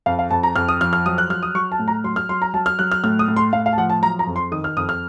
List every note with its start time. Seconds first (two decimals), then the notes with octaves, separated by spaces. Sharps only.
0.06 F2 F5
0.19 F5
0.31 F2 A5
0.43 A#5
0.56 F2 F6
0.69 D#6
0.81 F3 F6
0.93 F6
1.06 F#3 D#6
1.18 F#6
1.30 F#3 F6
1.43 D#6
1.55 F#3 C#6
1.72 A5
1.79 A2
1.88 A#5
2.04 F#3 C6
2.16 F6
2.29 F#3 C6
2.42 A#5
2.54 F#3 A5
2.66 F6
2.79 F#3 F#6
2.91 F6
3.04 A2 F6
3.19 D#6
3.28 A2
3.37 C6
3.53 A2 F5
3.66 F5
3.73 A5
3.78 F3 F#5
3.90 A5
4.02 F#3 A#5
4.19 A#5
4.27 F2
4.36 C6
4.52 D#3 D#6
4.64 F6
4.77 F2 D#6
4.89 F6